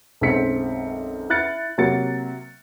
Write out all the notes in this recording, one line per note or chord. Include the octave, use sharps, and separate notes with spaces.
B1 F#2 G#3 C4 B6 C#7
E4 F6 F#6 A6 C#7
C3 F#3 A#3 A6 C#7